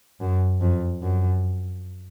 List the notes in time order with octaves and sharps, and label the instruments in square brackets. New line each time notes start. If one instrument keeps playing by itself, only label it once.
[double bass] F#2
F2
F#2